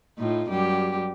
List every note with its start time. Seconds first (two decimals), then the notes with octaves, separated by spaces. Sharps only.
0.18 A2 D#4 F4
0.49 F#2 G3 G4